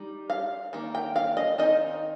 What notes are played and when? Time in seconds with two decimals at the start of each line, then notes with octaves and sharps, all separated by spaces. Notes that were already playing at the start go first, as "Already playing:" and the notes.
Already playing: G3 D#4
0.30 F5
0.73 D#3 A#3
0.95 G5
1.16 F5
1.37 D#5
1.58 D#3 C4 D#4 D#5